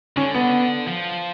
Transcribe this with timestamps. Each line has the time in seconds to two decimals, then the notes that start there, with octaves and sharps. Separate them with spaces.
0.17 D3 C#4
0.34 B3
0.87 F3